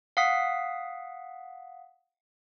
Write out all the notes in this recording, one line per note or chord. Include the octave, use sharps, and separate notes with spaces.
F5 F#5 D#6 B6